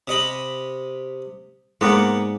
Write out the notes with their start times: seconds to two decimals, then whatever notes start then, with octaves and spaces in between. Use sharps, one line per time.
0.08 C3 D#5 B5
1.81 G#2 A#3 B3 D5 F#5